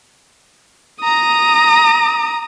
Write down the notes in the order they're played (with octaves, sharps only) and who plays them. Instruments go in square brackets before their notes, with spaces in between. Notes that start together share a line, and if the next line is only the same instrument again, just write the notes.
[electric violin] A#5 D#6